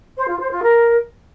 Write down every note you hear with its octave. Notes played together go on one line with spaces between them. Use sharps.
C5
F4
C5
F4
A#4